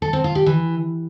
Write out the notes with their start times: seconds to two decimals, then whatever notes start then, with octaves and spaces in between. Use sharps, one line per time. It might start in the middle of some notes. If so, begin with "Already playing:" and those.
0.02 A4
0.13 C4
0.24 F4
0.35 G4
0.46 E3